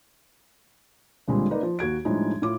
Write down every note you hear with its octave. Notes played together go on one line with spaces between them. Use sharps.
C#2 A#2 D3 G3 G#3 C4
A#3 D#4 B4 D5
F3
D#2 F#4 G#6 D7
A2 F3 G3 G#3 D4 D#4
A2 F4 D6